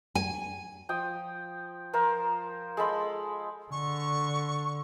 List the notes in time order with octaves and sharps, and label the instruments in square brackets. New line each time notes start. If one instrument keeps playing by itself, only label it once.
[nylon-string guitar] G#5
[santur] F3 G5 D#6
F3 F4 A#4 C5
G#3 A4 B5 C6
[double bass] D3 [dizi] C#6